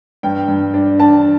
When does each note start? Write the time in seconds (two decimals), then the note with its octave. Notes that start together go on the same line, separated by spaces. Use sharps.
0.23 G2 G5
0.48 G2
0.74 D4
0.99 D4 A5